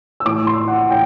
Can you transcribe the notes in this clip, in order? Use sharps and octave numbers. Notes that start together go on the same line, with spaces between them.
E6
A2 E3 D6
C6
F#5
A2 E3 G5